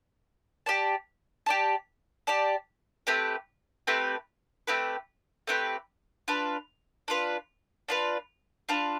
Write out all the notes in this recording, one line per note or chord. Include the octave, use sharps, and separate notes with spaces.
G4 D5 A5
G4 D5 A5
G4 D5 A5
A3 C4 G4 B4
A3 C4 G4 B4
A3 C4 G4 B4
A3 C4 G4 B4
D4 F4 B4
D4 F4 B4
D4 F4 B4
D4 F4 B4